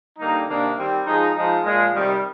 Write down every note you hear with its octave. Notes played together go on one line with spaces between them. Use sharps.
D3 G3 A#3 D#4
C3 D#3 A#3 D4
D#3 G3 C4
F3 G#3 D#4
F3 G#3 D#4
A#2 F3 G#3
C3 D#3 G3